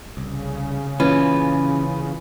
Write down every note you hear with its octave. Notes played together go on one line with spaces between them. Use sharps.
C2 C#3
A#2 E3 C#4 F4 B4